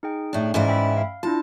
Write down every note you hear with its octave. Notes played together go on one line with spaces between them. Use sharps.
D#4 G#4 G5
A2 D4
G#2 E3 C#4 E4 D5 F5
E5 G5 B5
F5
D4 E4 F4 A5